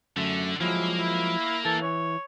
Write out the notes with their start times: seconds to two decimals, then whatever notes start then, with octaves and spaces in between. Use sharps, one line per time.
0.17 F#2 D3 A3
0.61 F3 F#3 G#3 A#3 E4
0.98 E4
1.65 E3 A4
1.83 C#5